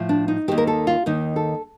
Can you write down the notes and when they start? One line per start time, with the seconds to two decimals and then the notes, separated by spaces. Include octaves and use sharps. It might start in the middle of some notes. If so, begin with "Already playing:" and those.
Already playing: A2 F3
0.09 D4
0.28 D#4
0.48 D#2 D#3 G4
0.58 A#4
0.67 A4
0.87 F4
1.06 D#2 D#3 D#4
1.36 A4